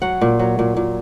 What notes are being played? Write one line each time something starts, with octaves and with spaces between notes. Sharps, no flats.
F#3 F#5
A#2
F#3
A#2
A#2